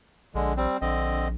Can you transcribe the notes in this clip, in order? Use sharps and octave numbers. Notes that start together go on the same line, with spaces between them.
A#1 D3 G#3
G3 C4
A#1 D3 C4 D#5